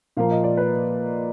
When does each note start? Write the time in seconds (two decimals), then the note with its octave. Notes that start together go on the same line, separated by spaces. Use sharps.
0.17 A#2 F3 A#3 F5
0.31 D#5
0.44 D5
0.57 B4